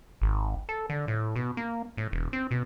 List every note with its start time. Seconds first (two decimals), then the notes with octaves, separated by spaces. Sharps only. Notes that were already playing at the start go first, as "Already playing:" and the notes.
0.22 G#1
0.69 A4
0.90 D3
1.08 A2
1.36 B2
1.57 A#3
1.97 A2
2.12 E1
2.33 C4
2.51 B2